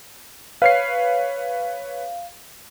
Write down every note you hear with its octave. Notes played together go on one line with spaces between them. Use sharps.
B4 C#5 F5 C7